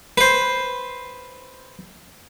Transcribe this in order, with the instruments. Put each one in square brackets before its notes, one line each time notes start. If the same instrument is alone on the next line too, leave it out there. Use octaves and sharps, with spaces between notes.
[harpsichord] B4 C5